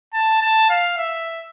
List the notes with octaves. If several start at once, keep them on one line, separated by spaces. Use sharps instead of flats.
A5
A5
F5
E5